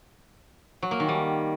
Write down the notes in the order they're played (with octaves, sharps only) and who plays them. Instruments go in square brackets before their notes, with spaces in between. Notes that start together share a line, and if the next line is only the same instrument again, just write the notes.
[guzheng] F#3
A#3
D#3
G3